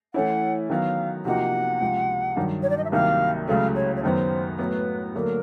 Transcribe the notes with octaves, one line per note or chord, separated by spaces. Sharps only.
E3 A3 C#4 E4 F#5
D#3 F#3 B3 F5
C3 F3 A#3 D#4 F#4 F#5
C#2 C3 F3
G2 D#3 F#3
C#5
D5
D#5
E5
C2 C3 D#3 F#3 A#3 F5
C#2 C#3 F#3 A3 F5
C#5
C#5
F#2 D#3 F#3 B3 C5
A2 F#3 B3 B4
D2 D3 F#3 A#3 A#4